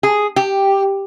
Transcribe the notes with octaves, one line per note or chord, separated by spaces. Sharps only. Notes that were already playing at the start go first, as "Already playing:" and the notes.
G#4
G4